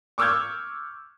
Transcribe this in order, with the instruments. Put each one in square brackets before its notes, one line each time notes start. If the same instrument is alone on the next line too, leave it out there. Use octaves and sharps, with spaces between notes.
[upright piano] C#6 D6 E6 F6 G6 G#6